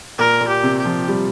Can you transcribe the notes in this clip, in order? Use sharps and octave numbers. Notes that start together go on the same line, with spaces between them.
A#2 A#4
A#2
G4
C3
G4
F3
G3